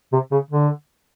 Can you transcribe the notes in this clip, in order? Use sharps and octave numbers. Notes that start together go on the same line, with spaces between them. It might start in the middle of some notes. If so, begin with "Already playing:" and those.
C3
C#3
D3